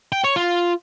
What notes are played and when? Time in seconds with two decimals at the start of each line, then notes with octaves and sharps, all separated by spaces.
0.12 G5
0.24 C#5
0.36 F4